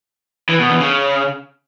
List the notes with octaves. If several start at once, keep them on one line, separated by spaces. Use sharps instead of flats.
E3
B2
E2
C#3